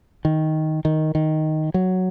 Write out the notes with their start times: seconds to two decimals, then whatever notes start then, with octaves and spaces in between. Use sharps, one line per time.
0.25 D#3
0.85 D#3
1.15 D#3
1.74 F#3